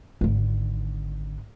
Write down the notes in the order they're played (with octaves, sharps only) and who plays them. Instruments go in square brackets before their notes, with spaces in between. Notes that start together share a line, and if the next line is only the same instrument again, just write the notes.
[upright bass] G#1 D3